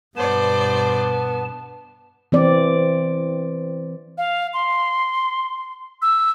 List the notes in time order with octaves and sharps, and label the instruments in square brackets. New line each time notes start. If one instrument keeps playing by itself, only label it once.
[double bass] G2 B2 [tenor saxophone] B3 [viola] C5 D5 [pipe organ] A5
[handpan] E3 C4 D5
[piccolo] F5
C6
E6